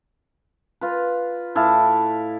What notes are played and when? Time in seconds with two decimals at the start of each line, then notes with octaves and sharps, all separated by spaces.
0.81 F4 B4
1.55 A2 E4 F5 A5